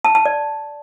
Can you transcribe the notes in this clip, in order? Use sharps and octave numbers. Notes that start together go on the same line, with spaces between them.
A5
A5
D5